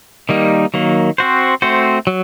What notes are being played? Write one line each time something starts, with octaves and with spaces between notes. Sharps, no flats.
D#3 G3 A#3 D#4
D#3 F#3 A#3
C4 F#4 C5
A3 C4 F#4 C5
F#3